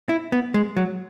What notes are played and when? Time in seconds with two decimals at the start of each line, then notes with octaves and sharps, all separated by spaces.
0.09 E4
0.32 B3
0.54 G#3
0.77 F#3